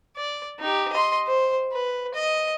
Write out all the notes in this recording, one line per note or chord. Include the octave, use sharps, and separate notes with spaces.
D5
D#4 G4
D#5 C6
C5
B4
D#5